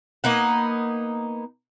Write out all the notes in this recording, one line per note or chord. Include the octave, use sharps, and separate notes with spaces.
A#3 B3 D#4 F#5